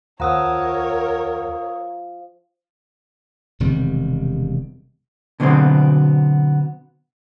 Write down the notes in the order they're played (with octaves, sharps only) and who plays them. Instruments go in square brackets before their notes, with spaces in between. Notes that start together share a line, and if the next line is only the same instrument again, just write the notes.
[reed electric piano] D#2 F#5 [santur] F3 [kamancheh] A#4 C#5 [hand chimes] A#5 D#6 E6
[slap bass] E1 C3 D#3 G3
[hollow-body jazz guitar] B2 D3 F#3 B3 C4